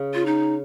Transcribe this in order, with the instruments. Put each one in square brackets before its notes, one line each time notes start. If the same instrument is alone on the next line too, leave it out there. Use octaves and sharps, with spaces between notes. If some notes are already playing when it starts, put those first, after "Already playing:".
Already playing: [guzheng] C#3
[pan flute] F4
D#4